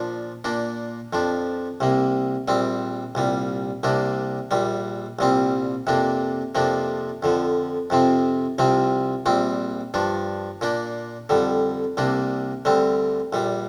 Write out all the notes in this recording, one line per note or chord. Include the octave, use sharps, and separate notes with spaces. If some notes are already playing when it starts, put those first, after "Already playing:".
Already playing: A#2 F3 D4
A#2 A#3 D4
F2 F3 D4
C2 C3 A#3
A#1 A#2 G3 C4
C2 A#2 G3
C2 C3 A#3 D4
A#1 A#2 G3
C2 A#2 G3 C4
F2 C3 A#3 D4
F2 C3 F3 A#3 D4
F2 D3 F3
F2 C3 F3 C4
C2 C3 F3 C4
A#1 A#2 G3 C4
G2 F3 D4
A#2 A#3 D4
F2 D3 G3
C2 C3 A#3 D4
D2 D3 G3 C4
A#1 A#2 G3